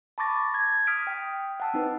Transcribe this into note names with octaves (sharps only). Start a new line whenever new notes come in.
A5 B5 C#6 D6 A6 A#6
G#6
D#6 F6 B6 D7
G5
F#5 A5 E6
C4 D#4 B4